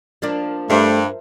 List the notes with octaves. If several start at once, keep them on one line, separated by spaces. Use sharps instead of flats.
F3 A#3 D4
G2 A3 D4 A#4 C5 E5